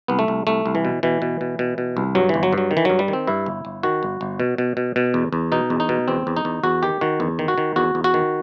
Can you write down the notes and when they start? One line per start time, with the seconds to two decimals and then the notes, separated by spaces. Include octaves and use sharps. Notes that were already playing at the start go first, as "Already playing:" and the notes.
0.08 C2 B3
0.19 A3
0.28 C2
0.47 C2 A3
0.66 C2
0.75 E3
0.85 B2
1.03 B2 E3
1.22 B2
1.41 B2
1.59 B2
1.78 B2
1.97 C2
2.15 G2 F#3
2.29 G1 E3
2.43 F#3
2.53 G2
2.58 F#3
2.71 D#3
2.77 E3
2.85 G2 F#3
2.99 G3
3.08 D#3
3.13 C4
3.27 G2 E4
3.46 G1
3.65 G1
3.83 D#3 F#4
4.03 G1
4.21 G1
4.40 B2
4.58 B2
4.77 B2
4.96 B2
5.14 E2
5.33 E2
5.52 B2 D#4
5.70 E2
5.80 D#4
5.89 B2
6.08 E2 C4
6.27 E2
6.37 D#4
6.45 E2
6.63 E2 F#4
6.83 D#3 G4
7.01 D#3 F#4
7.20 E2
7.39 D#3
7.48 F#4
7.58 D#3
7.76 E2 F#4
7.95 E2
8.04 F#4
8.14 D#3